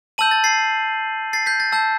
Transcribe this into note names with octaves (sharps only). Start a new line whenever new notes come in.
A5 E6 G6 D#7 F#7
A6
A6 C7
A6 C7
G6 B6
A6
A5 E6 G6